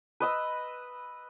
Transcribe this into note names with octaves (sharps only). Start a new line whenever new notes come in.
B4 D#5 E6